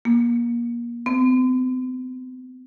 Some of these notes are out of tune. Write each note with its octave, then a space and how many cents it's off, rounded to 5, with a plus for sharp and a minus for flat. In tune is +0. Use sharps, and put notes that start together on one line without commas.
A#3 +30
C4 -45